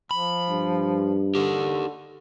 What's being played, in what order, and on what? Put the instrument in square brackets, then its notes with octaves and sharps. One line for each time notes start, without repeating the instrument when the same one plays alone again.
[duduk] F3 [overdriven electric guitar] B5
[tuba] G2
[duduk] D3 [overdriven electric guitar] D#4 G4